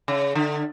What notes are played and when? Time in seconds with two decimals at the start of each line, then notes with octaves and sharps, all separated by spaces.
0.08 C#3
0.35 D3